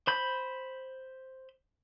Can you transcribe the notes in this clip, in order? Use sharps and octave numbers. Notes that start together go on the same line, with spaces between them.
C5 B5 G6